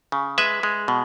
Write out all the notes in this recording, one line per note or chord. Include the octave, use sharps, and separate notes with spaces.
C#3
G#3 B4 E5
G#3
B2